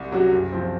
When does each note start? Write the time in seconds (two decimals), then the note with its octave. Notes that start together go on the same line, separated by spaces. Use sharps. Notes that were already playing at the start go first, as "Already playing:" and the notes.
Already playing: C2
0.11 C3 F#3 C#4 F#4
0.32 F#1
0.52 F3 C4